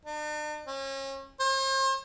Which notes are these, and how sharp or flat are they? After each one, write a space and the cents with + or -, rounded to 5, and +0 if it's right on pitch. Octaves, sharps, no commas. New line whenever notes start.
D4 +45
C#4 -35
C5 +40